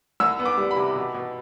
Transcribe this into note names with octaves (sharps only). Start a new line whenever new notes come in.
C2 E6
B3
D6
G3
B5
C3
B2
B2